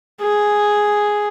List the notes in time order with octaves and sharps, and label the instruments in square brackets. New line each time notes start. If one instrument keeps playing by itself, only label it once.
[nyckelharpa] G#4